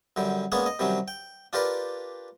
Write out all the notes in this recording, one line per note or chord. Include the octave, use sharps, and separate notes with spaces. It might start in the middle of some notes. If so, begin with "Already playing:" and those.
F#2 D3 G3
G#3 A#3 B3 C#4 D4 G#4
D#5
C3 D#3 F#3 G3 C#4
G5
D4 F4 G4 A#4 B4 D5